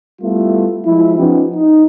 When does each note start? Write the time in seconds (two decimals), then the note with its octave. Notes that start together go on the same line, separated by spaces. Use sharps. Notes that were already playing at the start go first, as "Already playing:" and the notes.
0.22 G3 A3 B3 E4 F4
0.86 F3 G#3 E4
1.18 F3 B3 C#4 D#4 G4
1.54 D#4